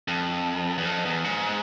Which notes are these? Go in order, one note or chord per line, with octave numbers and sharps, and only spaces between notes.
F2
E2
F2
E2
G#2